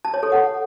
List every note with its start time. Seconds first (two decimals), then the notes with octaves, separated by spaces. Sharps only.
0.05 A5
0.14 C#5
0.23 A4
0.32 F#5